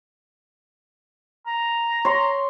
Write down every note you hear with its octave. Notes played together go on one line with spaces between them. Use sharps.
A#5
C#5 C6